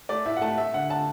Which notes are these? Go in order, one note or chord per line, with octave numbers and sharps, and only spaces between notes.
A3 D5
A2 E5
F#5
A3 A5
A3 E5
D3 F#5
D3 A5